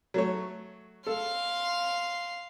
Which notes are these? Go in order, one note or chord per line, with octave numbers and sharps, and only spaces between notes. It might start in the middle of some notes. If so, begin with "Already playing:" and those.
F#3 A3 C#5
A4 F5 C6